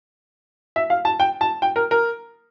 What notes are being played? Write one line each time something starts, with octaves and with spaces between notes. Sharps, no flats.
E5
F5
A5
G5
A5
G5
A#4
A#4